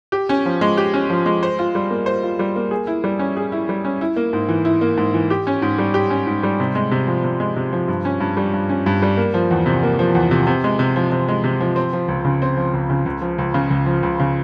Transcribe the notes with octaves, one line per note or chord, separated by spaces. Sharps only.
G4
C#4
F3
G#3
G4
C#4
F3
G#3
C5
F4
G3
A#3
C5
F4
G3
A#3
G#4
E4
G3
C#4
G#4
E4
G3
C#4
E4
A#3
G#2
E3
E4
A#3
G#2
E3
G4
C#4
G#2
G3
G4
C#4
G#2
G3
C3
G#3
C3
F3
C3
G#3
C3
F3
G2
C#4
G2
G3
G2
C#4
G2
G3
A#3
F3
E2
C3
A#3
F3
E2
C3
C3
G#3
C3
F3
C3
G#3
C3
F3
C4
F3
C#2
C#3
C4
F3
C#2
C#3
C#2
F3
C#2
C#3
C#2
F3
C#2
C#3